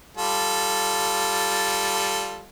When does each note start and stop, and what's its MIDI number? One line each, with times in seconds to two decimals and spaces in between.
0.17 2.46 55
0.17 2.46 65
0.17 2.46 69